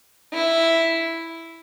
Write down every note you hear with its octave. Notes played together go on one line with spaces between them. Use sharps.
E4